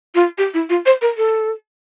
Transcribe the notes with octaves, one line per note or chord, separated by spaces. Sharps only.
F4
G4
E4
F4
C5
A#4
A4